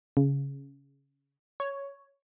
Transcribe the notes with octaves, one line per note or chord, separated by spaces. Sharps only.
C#3
C#5